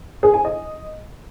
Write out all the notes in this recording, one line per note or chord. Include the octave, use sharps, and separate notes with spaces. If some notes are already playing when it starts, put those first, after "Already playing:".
G#4
G#5
D#5